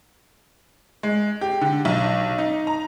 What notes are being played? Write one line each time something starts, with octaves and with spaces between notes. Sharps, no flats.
G#3
G4
D3
B1
D#4
A#5